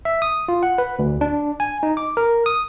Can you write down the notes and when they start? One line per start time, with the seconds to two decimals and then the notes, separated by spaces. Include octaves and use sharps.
0.05 E5
0.22 D#6
0.48 F4
0.63 F#5
0.78 B4
0.99 D2
1.21 D4
1.60 G#5
1.83 D#4
1.97 D6
2.17 A#4
2.46 D#6